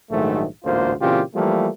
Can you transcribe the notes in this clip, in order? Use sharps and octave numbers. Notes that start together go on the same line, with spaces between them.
A#1 G#2 D#3 F#3 A3
A1 D2 G#2 A#3 F4 C5
A#2 C#3 E3 C4 F4 G4
E3 F3 G3 A3 A#3